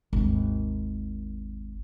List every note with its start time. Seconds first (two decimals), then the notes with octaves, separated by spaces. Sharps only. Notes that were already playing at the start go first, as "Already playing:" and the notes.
0.13 G#1 D#2